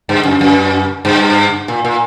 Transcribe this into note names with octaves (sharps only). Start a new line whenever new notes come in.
G2
F#2
F#2
G2
A#2
A#2